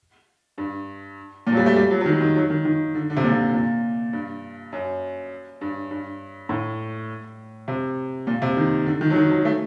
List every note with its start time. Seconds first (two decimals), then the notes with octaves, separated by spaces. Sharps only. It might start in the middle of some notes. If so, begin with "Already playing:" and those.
0.58 G2
1.47 A#2
1.52 F#3
1.57 G3
1.66 A3
1.76 G3
1.91 F#3
2.01 F#3
2.06 D#3
2.21 D#3
2.36 F#3
2.50 D#3
2.65 D#3
2.94 D3
3.10 D3
3.17 C3
3.24 A#2
3.31 C3
3.53 A#2
4.13 G2
4.72 F#2
5.61 G2
5.91 G2
6.49 A2
7.68 C3
8.27 A#2
8.42 C3
8.57 D#3
8.86 D3
9.01 D#3
9.10 F#3
9.16 D#3
9.30 F#3
9.45 A3